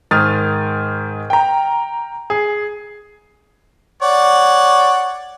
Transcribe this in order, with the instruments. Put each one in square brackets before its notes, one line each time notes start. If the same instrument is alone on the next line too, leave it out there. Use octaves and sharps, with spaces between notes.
[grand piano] G#2 D#3 D#6 F6 A6
G5 A#5
G#4
[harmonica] C#5 D5 F#5